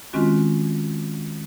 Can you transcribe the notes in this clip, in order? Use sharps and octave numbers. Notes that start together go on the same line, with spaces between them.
D#3 G#3 C4 C#4 F4 F#4